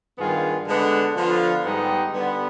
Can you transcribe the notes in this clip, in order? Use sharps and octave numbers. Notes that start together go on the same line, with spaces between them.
G2 D#3 B3 F4 G#4
D3 G#3 B3 D4
D3 F3 B3 F4
G#2 G3 B3 D#4 G4
D3 G3 B3